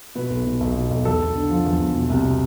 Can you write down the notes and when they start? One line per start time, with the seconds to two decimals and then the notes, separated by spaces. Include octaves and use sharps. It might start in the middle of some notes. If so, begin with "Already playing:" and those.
0.15 B2 B4
0.30 B1
0.46 B2
0.61 B1
0.75 B2
0.91 B1
1.05 E2 A4
1.20 E2
1.35 D3
1.50 F3
1.65 E2
1.80 E2
1.95 B2
2.10 C2
2.24 B2